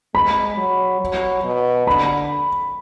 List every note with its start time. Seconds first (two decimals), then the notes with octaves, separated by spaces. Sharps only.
0.15 G#3 B5
0.57 F#3
1.01 F#3
1.44 B2
1.87 D3 B5